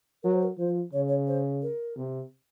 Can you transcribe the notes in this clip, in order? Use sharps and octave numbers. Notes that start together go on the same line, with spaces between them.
F#3 A#4
C5
A#4
F3 C5
C#3 C#5
C#5
C5
A#4
C3